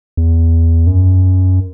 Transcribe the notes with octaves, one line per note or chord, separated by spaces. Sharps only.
E2
F#2